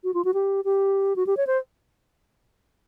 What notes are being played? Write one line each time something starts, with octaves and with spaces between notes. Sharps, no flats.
F#4
F4
F#4
G4
G4
F#4
G4
C#5
C5